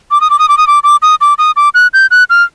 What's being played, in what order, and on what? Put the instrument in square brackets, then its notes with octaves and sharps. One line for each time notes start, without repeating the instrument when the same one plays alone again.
[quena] D6
D#6
D6
D#6
D6
D#6
D6
D6
D#6
D6
D#6
D6
F#6
G6
F#6
F6